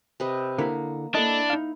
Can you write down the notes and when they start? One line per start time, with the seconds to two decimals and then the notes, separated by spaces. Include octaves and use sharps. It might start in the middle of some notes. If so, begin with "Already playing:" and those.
0.20 C3 B4 D#5
0.58 D3 A#3 E4 B5
1.15 A#3 D4 E4 A4 D#5
1.50 D#4 F5